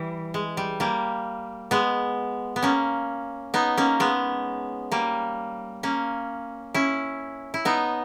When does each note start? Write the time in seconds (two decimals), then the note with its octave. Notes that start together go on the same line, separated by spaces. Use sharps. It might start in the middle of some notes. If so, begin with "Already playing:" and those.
Already playing: E3 G3
0.34 G#3
0.57 G3
0.80 G3 A#3
1.71 G#3 B3
2.56 B3
2.63 A#3 C#4
3.54 B3 D#4
3.77 A#3 C#4
4.00 G#3 B3
4.92 G3 A#3
5.83 A#3 C#4
6.74 C#4 E4
7.54 E4
7.65 B3 D#4